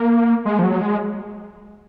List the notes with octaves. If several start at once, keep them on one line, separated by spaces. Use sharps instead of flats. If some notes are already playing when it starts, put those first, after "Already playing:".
Already playing: A#3
G#3
F3
F#3
G#3